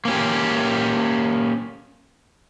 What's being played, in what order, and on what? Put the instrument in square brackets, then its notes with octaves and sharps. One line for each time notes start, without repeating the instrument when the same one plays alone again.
[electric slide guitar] A#3 C#4 G4